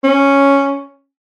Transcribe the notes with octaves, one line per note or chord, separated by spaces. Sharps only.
C#4